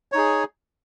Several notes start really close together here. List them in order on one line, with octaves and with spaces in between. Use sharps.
C#5 D#4 G#4